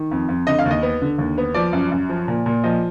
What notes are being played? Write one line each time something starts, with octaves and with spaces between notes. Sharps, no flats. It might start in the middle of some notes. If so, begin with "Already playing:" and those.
Already playing: D#3
F2
F2
D3 D#5
F5
D#2
D#5
B3
D3
D#2
B3
F3 D5
F#2
F#2
F3
A#2
A#2
F3 D#5